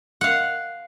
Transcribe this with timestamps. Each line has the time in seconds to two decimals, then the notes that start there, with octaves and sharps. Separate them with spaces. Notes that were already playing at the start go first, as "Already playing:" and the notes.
0.21 F5 F#5